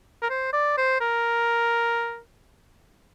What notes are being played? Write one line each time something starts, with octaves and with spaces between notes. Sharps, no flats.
A#4
C5
D5
C5
A#4